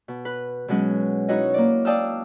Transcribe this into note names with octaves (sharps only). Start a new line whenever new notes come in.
B2
B4
B2 F#3 G#3 C#4
D#4 E4 F#4 C#5 D#5
A#3 D5
D5 F5 G5 A5 D#6 E6